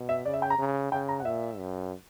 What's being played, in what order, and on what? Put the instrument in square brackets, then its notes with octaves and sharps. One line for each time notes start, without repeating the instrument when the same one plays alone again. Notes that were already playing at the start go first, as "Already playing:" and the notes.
Already playing: [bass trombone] B2
[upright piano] E5
[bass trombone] C#3 [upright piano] D5
[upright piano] E5
G5
A#5
[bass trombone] C#3
[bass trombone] C#3 [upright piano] G5
[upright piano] A#5
F#5
[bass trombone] A#2 [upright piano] E5
[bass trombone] F#2